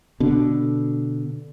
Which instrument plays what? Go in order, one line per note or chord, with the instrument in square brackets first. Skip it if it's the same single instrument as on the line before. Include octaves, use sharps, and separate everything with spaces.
[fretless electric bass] B2 D3